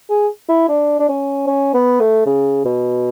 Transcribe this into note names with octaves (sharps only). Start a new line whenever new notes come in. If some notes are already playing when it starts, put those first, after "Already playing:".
G#4
E4
D4
D4
C#4
C#4
B3
A3
C#3
B2